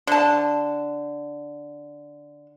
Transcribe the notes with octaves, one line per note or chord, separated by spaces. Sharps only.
D3 A5